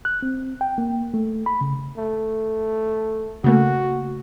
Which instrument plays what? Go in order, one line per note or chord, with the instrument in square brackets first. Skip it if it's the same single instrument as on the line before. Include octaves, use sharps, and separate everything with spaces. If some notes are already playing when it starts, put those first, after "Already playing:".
[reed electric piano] F#6
C4
G5
A#3
A3
B5
C#3
[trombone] A3
[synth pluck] C#3 A3 A#3 [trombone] F#4